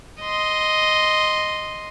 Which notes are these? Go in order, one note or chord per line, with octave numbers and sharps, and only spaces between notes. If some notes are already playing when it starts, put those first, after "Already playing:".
D#5 C6